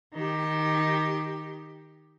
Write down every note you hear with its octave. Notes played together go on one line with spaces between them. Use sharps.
D#3 G4